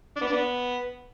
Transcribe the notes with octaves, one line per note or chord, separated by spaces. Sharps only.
D4
B3
D4
B3